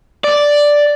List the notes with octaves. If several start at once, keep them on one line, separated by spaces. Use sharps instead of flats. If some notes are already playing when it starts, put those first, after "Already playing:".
D5